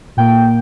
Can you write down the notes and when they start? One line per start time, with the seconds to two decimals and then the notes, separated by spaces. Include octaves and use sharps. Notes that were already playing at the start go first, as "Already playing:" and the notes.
0.17 A#2 A#3 G5